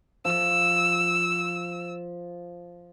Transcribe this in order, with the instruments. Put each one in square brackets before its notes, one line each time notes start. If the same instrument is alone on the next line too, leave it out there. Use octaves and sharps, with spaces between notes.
[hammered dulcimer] F3 [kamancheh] E6